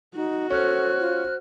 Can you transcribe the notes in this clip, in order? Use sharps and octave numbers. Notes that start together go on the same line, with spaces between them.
D#4 F#4
C#4 A4 C5 F6 F#6
F4